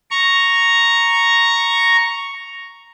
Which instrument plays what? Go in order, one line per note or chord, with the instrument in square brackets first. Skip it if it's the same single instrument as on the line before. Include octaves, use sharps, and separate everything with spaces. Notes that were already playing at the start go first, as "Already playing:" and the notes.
[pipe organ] A#5 C#6